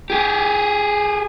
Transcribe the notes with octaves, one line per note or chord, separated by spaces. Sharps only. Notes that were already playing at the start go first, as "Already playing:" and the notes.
G4 G#4